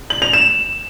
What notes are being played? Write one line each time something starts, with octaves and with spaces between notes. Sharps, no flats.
F#7
F7
E7